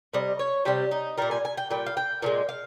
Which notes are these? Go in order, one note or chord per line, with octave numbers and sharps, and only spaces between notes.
C3 G3 D#5
C#5
C3 G3 G4
D#4
A#2 G3 A#4
G#5
G#5
G5
A#2 G3 G5
F5
G5
A#2 F3 G#3
F5